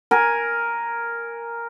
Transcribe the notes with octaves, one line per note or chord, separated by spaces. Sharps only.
A#4 G#5